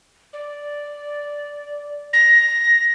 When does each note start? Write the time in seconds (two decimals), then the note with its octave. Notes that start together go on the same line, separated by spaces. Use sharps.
0.33 D5
2.13 A#6